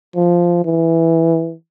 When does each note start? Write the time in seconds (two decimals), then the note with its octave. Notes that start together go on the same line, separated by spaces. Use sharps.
0.16 F3
0.65 E3